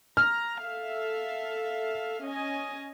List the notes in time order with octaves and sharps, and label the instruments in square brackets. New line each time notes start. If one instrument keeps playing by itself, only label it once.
[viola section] A#5 [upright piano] F6
[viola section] A4 E5 F5
C#4 D#5 G#5